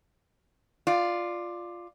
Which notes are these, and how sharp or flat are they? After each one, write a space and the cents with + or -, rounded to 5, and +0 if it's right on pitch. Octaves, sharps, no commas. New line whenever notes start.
F4 +0 D5 +10